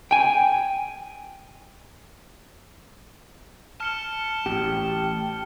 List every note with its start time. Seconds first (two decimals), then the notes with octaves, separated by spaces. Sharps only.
0.11 G5 G#5
3.80 A5 F6 C#7 G7
4.46 A1 G4